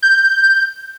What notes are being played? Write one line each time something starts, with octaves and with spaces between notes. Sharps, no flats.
G6